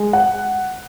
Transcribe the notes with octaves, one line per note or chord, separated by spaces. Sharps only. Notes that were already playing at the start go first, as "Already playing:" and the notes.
Already playing: G#3
F#5